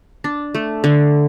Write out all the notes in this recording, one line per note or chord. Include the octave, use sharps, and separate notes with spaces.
D4
A3
D3